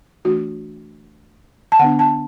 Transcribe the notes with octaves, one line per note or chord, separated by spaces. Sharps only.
E3 A3 D4 F#4
A5
D3 B3 D4 F#5
A5